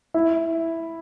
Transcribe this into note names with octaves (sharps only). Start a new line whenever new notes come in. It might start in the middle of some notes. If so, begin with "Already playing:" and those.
E4